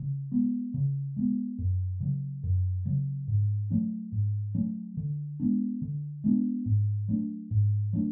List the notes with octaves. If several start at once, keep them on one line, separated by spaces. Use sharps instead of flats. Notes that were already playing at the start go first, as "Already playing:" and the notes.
Already playing: C#3
G#3 B3
C#3
G#3 B3
F#2
C#3 F#3
F#2
C#3 F#3
G#2
F#3 A3 C#4
G#2
F#3 A3 C#4
D3
G#3 B3 D4
D3
G#3 B3 D4
G#2
F#3 A3 D4
G#2
F#3 A3 D4